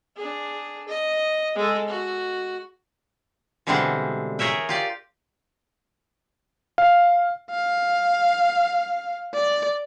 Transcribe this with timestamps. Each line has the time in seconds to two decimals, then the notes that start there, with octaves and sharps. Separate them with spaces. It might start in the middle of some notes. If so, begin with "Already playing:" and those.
0.17 D4 G#4
0.88 D#5
1.55 G#3 A4
1.88 F#4
3.67 B2 D3 E3 G3 G#3 C4
4.39 G#4 A#4 C#5 E5 G5
4.69 F4 G4 D5
6.78 F5
7.50 F5
9.34 D5